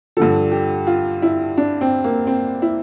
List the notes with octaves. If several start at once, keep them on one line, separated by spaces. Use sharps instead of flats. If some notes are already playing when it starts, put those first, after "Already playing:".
G2 D3 F3 A4
G4
F4
E4
D4
C4
A#3
C4
E4